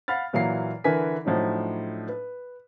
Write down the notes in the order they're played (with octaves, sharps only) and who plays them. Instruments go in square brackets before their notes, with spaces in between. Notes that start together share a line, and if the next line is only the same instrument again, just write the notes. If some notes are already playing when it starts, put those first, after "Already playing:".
[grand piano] F5 F#5 B5 F6 A6
A#2 E3 F#3 F5 A#5 C7
D3 E3 A#4 B4 G#5 B6
A2 F3 F#3 D4 D#4
B4